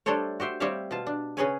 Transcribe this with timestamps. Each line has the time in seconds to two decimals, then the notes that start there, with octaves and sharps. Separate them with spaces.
0.06 G3 A3 D4 A4 C5 C#5
0.40 F#4 G4 C5 E5
0.60 G3 C4 G4 C#5 E5 F5
0.91 B2 F4 A5
1.07 D4
1.37 C#3 C#4 G#4 B4 C#5 G#5